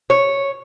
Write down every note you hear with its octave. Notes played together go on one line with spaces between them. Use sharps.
C#5